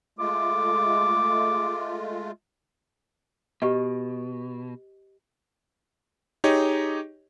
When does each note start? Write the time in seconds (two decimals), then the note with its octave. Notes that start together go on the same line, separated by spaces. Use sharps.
0.19 G#3 A3 F4 D6
3.62 B2 G4 B4 D#5
6.44 D#4 G4 G#4 C#5 D#5